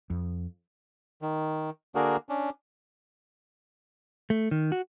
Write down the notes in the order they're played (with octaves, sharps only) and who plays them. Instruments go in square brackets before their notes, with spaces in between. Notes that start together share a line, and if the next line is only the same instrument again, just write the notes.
[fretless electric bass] F2
[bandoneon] D#3
D3 A#3 D4 F#4 G#4 A#4
C#4 D4
[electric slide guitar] A3
D#3
F#4